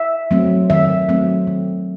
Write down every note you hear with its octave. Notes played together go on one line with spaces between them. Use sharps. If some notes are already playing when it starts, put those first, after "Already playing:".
Already playing: E5
F#3 A3 C4
D#3 E5
F#3 A3 C4
D#3